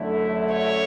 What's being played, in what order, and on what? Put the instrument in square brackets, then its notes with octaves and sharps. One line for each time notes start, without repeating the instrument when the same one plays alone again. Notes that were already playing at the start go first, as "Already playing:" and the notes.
Already playing: [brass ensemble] F#2 D3 A3 E4
[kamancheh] C#5